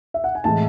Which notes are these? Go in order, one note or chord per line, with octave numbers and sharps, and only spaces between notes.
E5
F#5
G#5
A2 E3 G#3 A5